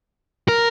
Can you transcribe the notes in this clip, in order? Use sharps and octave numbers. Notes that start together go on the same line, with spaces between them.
A#4